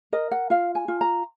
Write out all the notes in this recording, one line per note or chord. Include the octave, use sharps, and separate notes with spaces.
A#4 D#5
F#5
F4 F5
G#5
F4
A#5